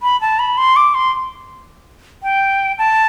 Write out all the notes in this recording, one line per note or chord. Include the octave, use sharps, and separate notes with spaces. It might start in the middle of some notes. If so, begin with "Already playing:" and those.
B5
A5
B5
C6
D6
C6
G5
A5